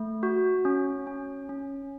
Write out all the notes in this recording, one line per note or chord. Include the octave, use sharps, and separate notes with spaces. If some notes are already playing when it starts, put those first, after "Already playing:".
Already playing: A3
F#4
C#4
C#4
C#4